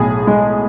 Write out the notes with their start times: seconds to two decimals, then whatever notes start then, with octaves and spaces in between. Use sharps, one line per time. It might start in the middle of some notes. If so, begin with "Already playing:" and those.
Already playing: B1 A2 G#4
0.27 G#3